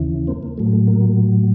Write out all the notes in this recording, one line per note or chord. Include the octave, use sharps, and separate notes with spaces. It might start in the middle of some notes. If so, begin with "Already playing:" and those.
Already playing: D#2 C#3 E3
A#3 C4
A#3
A2 F#3 A3
A3
A#3